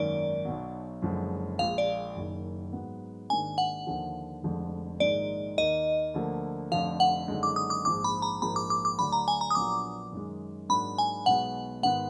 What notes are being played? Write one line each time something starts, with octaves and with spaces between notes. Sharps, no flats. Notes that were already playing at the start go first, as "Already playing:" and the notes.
Already playing: G#1 F#2 D#3 A#3 D5
B1 B2 F#3
F#1 F#2 D3 F3 G#3
A#1 A#2 G#3 F5
D5
F#1 F#2 D#3
G#2 F#3 B3
G#1 G#2 D#3 A#3 D4 G#5
F#5
D#2 D3 F3
F1 F2 D3 F3 G#3
A#1 G#2 D#3 G#3 D#4 D5
D#2 D#3 A#3 D#5
D2 D3 F3 A#3
F1 F2 D3 F3 F5
F#5
F#1 F#2 D3 G#3 D#4
D6
D#6
D6
A#1 G#2 F3 D6
B5
A#5
A#1 G#2 F3 A#3 B5
D6
D6
D6
D2 D3 F#3 D4 B5
A#5
G#5
A#5
D#6
A#1 A#2 F#3 B3 D4 D6
F#2 D#3 G#3
G#2 F#3 A#3 D4 B5
G#5
B1 B2 G#3 B3 F#5
G#1 G#2 D#3 G#3 B3 F#5